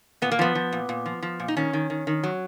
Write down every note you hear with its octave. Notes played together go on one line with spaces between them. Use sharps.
A#2 B3
A#3
F3 B3
F3
A#2
A#2
F3
F3
A#2
D#4
D#3 C#4
D#3
D#3
D#3
F#3